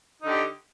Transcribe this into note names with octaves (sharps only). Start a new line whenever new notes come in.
D3 D#4 G4